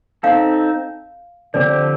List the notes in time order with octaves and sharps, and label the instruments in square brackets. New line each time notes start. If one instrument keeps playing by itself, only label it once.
[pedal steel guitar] C4 D#4 A4 [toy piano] F5
[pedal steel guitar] D3 F3 C4 G4 C5 [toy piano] D5